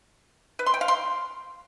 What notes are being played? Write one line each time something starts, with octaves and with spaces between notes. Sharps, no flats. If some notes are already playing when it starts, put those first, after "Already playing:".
B4
C6
G5
F5
C6